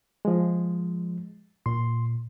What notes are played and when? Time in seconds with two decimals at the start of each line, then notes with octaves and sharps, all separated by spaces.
0.25 F3 G#3
1.66 A#2 C6